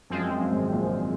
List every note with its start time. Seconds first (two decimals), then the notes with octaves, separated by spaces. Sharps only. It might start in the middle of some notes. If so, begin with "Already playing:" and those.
0.10 F#2 F3 G#3 C4
0.21 F#2
0.31 F#2
0.41 F#2
0.51 G#1 G#2
0.72 A#1 A#2